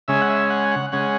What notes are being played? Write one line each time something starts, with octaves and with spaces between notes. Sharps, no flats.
C#3 G#3 C#4 E5
F#5
E5
F#5
F#5
C#3 G#3 C#4 F#5